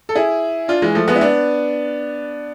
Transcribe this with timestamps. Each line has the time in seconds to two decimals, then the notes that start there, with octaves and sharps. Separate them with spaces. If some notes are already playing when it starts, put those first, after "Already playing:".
0.09 A4
0.15 E4 G#4
0.68 D4 F4
0.82 E3 G#3
0.95 F3 A3
1.07 G#3 B3
1.16 E4
1.21 B3 D4